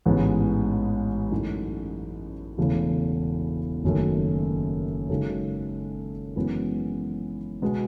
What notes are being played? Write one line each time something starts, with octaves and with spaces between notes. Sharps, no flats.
A1 G#2 E3 G#3 B3
F#2 E3 A3 D#4 F#4
E1 E2 C#3 E3 A3
F#1 F#2 D#3 A3
F#2 C#3 G#3 D#4 A4
F#2 E3 G#3 B3
B2 G#3 B3